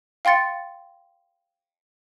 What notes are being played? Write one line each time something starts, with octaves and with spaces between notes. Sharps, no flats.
F5 G5 C6 A6 C#7